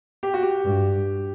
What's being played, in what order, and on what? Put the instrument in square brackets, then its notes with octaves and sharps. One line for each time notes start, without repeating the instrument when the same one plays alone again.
[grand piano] G4
F#4
G4
[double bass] G2